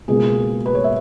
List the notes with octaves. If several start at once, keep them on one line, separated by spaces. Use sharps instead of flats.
C#2 B2 A#3 G#4
B4
C#5
E5